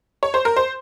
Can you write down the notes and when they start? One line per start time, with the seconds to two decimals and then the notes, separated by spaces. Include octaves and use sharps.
0.23 C#5
0.34 C5
0.45 A#4
0.56 C5